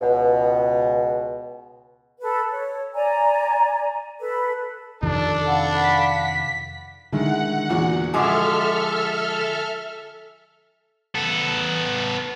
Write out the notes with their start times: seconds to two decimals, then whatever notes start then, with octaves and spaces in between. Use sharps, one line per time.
0.02 C#2 B2
2.20 A4 B4
2.52 C#5
2.94 D5 G#5 A#5
4.19 A4 B4
5.03 F2 C3 D#3 D4 A4
5.47 F5 F#5 B5
5.80 B6
7.12 D3 D#3 G#3 E4 F#5
7.69 E2 A#2 F#4
8.14 F3 G#3 F#4 A4 E5 G#5 D6 F6
11.15 B3 A4